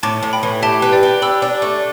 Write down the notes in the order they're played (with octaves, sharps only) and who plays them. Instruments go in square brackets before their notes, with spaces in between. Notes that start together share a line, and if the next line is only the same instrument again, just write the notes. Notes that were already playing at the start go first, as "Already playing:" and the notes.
[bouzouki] A2 [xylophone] A5 D6
[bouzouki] A2
[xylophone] G5 B5
[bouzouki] E3
[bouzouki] G4 [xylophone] E5 A5
[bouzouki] B4
[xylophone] D5 G5
[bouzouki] G4
[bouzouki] D4 [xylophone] B5 E6
[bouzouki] D4
A3